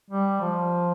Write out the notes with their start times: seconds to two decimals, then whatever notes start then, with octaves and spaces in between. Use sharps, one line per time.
0.10 G3
0.41 F3